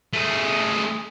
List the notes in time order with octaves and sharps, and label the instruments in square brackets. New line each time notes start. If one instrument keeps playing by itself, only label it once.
[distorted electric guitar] A3 G#4